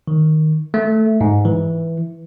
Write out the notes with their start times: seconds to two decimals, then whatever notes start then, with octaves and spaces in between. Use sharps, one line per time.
0.08 D#3
0.74 A3
1.21 G#2
1.45 E3